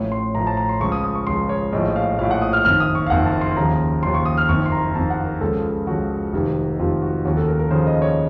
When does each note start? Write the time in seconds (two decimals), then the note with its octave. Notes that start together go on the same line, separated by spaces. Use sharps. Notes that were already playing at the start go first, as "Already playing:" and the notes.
Already playing: A1 A2 F3 C#5
0.12 C6
0.35 A1 A2 F3 A#5
0.47 A5
0.57 A#5
0.69 C6
0.80 C#2 C#3 F3 C#6
0.92 D#6
1.04 D#6
1.15 C#6
1.27 C#2 C#3 F3 C6
1.49 C#5
1.72 A#1 A2 F3 D#5
1.96 F5
2.19 A#1 A2 F3 F5
2.31 F#5
2.42 D#6
2.53 F6
2.65 F#1 F2 D#3 F6
2.80 D#6
2.95 C#6
3.07 F5
3.10 F#1 F2 D#3 F#5
3.26 A5
3.41 C6
3.56 D#2 C#3 F3 A#5
4.03 D#2 C#3 F3 C6
4.14 C#6
4.25 D#6
4.37 F6
4.49 F#1 F2 D#3 C#6
4.66 C6
4.72 A#5
4.95 F#1 F2 D#3 A5
5.10 F#5
5.25 A#4
5.41 C#2 C#3 F3 A4
5.86 C#2 C#3 F3 F#4
6.32 F1 F2 C3 D#3
6.79 F1 F2 C3 D#3 F4
7.02 F#4
7.25 D#2 C#3 F3 F#4
7.37 A4
7.48 A#4
7.59 A#4
7.71 D#2 C#3 F3 C5
7.87 D#5
8.02 C#5